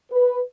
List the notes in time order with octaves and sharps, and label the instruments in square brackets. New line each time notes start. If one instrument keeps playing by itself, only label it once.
[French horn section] B4